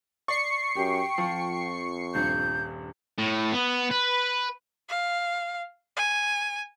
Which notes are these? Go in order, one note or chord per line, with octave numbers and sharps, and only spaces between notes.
D5 C#6 C7 C#7
F#2 G4 G5
F2 F3
D#1 G2 G6
A2
B3
B4
F5
G#5